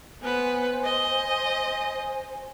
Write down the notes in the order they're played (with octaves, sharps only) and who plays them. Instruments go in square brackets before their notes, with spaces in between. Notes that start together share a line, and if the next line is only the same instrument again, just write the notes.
[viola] B3 B4 [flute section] C5 G#5
[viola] D#5